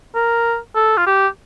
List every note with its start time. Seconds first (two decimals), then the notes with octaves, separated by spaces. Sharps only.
0.15 A#4
0.76 A4
0.97 F4
1.07 G4